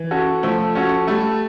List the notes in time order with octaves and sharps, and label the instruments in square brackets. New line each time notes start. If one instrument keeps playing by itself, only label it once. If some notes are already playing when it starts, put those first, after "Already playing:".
Already playing: [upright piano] E3
[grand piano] C#4 F#4 A4
[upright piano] F3 [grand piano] A3
[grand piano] C#4 F#4 A4
[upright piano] G3 [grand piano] A3